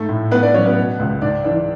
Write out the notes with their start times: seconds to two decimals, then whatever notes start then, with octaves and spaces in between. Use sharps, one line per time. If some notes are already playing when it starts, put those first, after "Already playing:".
Already playing: G#2 A3 A4
0.09 A2
0.31 A3 B3 B4
0.42 D4 D5
0.54 F#3 C#4 C#5
0.65 B3 B4
0.77 B2
0.99 C#2
1.21 G#2 D4 D5
1.44 E3 D4 D5